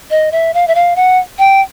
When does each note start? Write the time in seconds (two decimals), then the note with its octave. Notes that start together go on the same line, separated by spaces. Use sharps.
0.11 D#5
0.32 E5
0.54 F5
0.68 E5
0.75 F5
0.96 F#5
1.39 G5